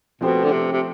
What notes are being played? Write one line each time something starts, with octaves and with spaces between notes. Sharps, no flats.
B2 F3 A3 C4 G4 C5
D3
C3
C3